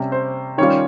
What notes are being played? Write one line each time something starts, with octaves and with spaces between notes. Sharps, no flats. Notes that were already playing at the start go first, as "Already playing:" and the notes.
Already playing: C3 G3 C#4
C5
D#3 G3 C#4 F4 C#5